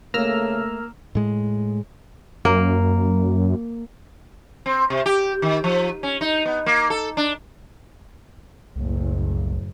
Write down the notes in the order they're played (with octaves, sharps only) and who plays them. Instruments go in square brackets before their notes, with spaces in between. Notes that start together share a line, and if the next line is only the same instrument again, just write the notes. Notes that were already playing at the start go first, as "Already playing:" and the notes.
[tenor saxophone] C#3 [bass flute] A3 [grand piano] A#3 [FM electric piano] A#5 E6 F6
[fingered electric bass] A2 G#3
[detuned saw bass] F#2 [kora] A#3
[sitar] C4
C3
G4
D#3
F3
C#4
D#4
B3
A#3
A4
D4
[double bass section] F#1 A2 [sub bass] C2